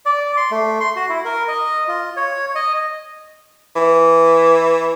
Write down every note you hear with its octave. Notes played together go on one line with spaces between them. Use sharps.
D5
C6
A3
C6
F#4
E4
A#4
D#5
F4
C#5
D#5
E3